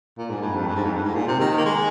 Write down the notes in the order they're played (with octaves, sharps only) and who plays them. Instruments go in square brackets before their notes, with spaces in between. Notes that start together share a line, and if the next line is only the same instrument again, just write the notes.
[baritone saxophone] A#2
G#2
G2
F2
G2
G#2
F2
G2
G#2
A#2
C3
D#3
A#3
G#3